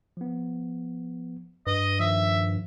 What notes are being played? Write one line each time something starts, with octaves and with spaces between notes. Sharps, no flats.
F3 B3
G2 B4 D#5
D#3 F3 E5